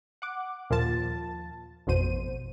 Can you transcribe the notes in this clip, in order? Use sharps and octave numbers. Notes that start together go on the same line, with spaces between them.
F#5 D6
D#2 A#2 F3 F4 A5 A6
A1 F2 B2 C5 D#7